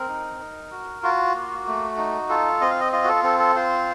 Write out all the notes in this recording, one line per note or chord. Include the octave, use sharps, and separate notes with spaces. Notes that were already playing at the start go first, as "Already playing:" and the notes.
Already playing: C4 A#4
D#4
D#4
F#4
F4 F#4
A#3
A3
D#4
F4 A4
C4 D#5
F5
D#5
F4 D#5
F#4
A4
C4 A4
A4
F4 C5